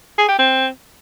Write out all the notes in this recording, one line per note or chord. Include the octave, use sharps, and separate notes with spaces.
G#4
G4
C4